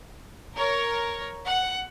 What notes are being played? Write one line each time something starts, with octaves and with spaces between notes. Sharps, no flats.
A#4 C#5
F#5